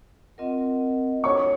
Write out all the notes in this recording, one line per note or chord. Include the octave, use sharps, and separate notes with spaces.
C4 F4 A#4 D#5 F#5
D4 F#4 A4 C5 C#5 C#6